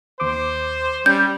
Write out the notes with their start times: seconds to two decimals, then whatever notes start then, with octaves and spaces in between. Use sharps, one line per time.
0.20 D#2 C5 D6
1.06 G3 C#4 G6